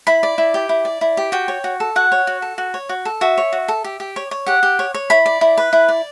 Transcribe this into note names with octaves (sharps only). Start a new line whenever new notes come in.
E4 B5
D5
E4
G4
E4
D5
E4
G4
F#4 G5
C#5
F#4
A4
F#4 F#5
C#5
F#4
A4
F#4
C#5
F#4
A4
F#4 E5
C#5
F#4
A4
G4
G4
C#5
C#5
G4 F#5
G4
C#5
C#5
E4 B5
D5
E4
B4
E4
D5